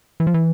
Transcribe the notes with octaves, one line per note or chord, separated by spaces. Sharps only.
E3
F3
E3